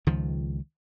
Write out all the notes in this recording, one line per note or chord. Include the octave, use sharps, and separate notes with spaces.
C#2 D#3 F3